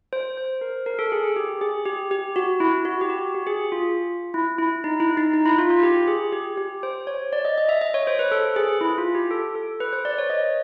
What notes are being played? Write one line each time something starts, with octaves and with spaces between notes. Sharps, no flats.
C5
C5
A#4
A#4
A4
G#4
G#4
G4
G#4
G4
G4
F#4
E4
F#4
G4
F#4
G4
G#4
F4
E4
E4
D#4
E4
D#4
D#4
E4
F4
F4
G4
G#4
G4
G4
C5
C#5
D5
D#5
D#5
E5
D#5
C#5
C5
B4
A4
G#4
E4
F4
G4
A4
A4
B4
C5
D5
C#5
D#5